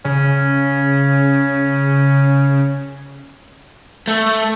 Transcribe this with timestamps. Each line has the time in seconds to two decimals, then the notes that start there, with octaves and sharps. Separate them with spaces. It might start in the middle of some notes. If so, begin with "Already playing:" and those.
0.05 C#3 C#4
4.07 A3